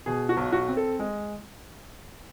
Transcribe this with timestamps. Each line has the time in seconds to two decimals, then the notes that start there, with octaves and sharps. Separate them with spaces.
0.06 B2 G#4
0.29 F#4
0.37 B1
0.52 F#4
0.68 C4
0.77 A4
0.99 G#3